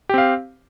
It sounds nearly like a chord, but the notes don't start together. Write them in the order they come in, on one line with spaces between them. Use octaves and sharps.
G4 C4 F5